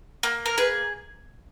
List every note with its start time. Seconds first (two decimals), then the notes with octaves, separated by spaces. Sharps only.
0.23 A#3
0.46 A#4
0.58 G#4 B4